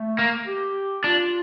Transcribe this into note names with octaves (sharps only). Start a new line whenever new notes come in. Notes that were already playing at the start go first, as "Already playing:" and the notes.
Already playing: A3
A#3
G4
D4 F4